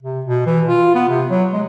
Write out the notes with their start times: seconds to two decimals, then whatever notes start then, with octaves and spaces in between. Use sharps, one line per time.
0.02 C3
0.25 B2
0.46 E3
0.66 F4
0.95 B3
1.09 C3
1.30 F#3
1.53 G#3